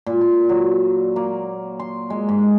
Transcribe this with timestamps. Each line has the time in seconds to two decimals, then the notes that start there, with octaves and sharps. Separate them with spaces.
0.06 A#2
0.21 C6
0.49 F#3
1.16 A#3
1.80 C6
2.10 G#3
2.29 G#2